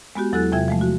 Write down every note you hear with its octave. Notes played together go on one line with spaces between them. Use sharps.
G#3 B3 F#4 G4
E2 F#3 E4 A4 F#6 A6
E2 C3 F4 E5 G5 G#6
F3 G#3 A3
F#4